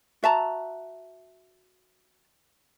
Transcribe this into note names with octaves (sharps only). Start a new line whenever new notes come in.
F#4 E5 A5 A#5